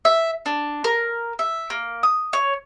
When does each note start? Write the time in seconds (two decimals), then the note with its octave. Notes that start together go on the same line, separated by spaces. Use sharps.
0.05 E5
0.46 D4
0.84 A#4
1.39 E5
1.70 A#3
2.03 D#6
2.33 C#5